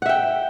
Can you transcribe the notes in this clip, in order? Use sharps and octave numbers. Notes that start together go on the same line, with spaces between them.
E5 F#5 G5